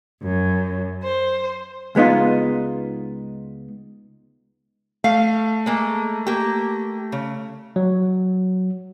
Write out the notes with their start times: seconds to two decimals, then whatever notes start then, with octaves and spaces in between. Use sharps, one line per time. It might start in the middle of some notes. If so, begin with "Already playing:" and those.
0.22 F#2
1.04 C5
1.95 C#2 G#3 B3 D#4 F4
5.04 A3 F5
5.66 G#3 A#3 A4
6.27 A#3 G4
7.12 C#3
7.76 F#3